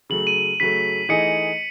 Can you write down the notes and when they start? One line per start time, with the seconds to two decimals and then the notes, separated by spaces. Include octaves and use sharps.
0.10 C#3 F#3 A3 F#7
0.27 D#7
0.60 C#3 F#3 A3 B6
1.09 E3 A3 D#4 G#4 D#5 C#7